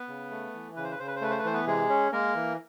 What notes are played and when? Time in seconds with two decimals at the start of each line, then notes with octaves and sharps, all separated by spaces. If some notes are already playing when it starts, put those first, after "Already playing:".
Already playing: B3 B4
0.08 C#3
0.31 A3
0.54 E3
0.76 C#3 B4
0.84 C5
0.92 B4
0.99 C#3 C5
1.08 B4
1.16 C5
1.21 A3 B4
1.31 C5
1.39 B4
1.44 E3 C5
1.53 B3 B4
1.66 C3 G#3 G#4
1.89 C#4
2.12 G#3 A#3 A#4
2.35 E3